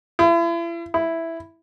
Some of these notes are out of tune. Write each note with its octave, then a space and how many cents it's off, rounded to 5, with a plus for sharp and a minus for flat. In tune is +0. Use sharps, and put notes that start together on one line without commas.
E4 +40
E4 +0